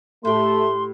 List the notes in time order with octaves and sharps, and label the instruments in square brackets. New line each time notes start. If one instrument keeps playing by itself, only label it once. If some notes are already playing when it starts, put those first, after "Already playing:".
[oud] A2 G4 [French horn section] A3 [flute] C6